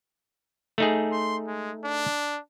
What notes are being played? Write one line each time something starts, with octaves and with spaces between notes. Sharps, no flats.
A3 D#4 G#4
C6
G#3
D4